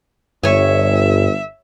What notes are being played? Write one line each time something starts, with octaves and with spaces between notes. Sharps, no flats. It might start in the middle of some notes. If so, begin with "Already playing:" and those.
G1 G2 C#5 E5 G#5